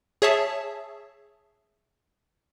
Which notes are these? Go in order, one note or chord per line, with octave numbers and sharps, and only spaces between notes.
G#4 C#5 E5 A5